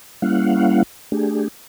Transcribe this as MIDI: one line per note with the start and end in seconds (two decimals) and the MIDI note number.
0.22 0.83 55
0.22 0.83 58
0.22 0.83 61
0.22 0.83 64
0.22 0.83 77
0.22 0.83 78
1.12 1.48 57
1.12 1.48 62
1.12 1.48 67
1.12 1.48 68